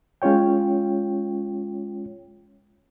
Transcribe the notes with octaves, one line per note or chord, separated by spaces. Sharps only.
G#3 C#4 F4 C#5 G5